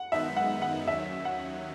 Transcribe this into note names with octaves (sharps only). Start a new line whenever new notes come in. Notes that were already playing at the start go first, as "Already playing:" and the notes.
Already playing: F#5
F#2 D#3 G#3 B3 D#4 E5
F#5
F#5
D#2 D#3 F#3 C#4 E5
F#5